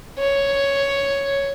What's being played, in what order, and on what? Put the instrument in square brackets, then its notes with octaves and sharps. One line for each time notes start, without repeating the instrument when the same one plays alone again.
[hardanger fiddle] C#5